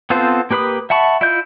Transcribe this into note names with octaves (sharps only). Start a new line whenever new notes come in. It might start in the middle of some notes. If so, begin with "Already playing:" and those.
B3 C4 F4 A4 C5
A#3 G4 B4 B5 D#6
E5 F#5 A5 B5 C#6
E4 F4 D#5 E5 G6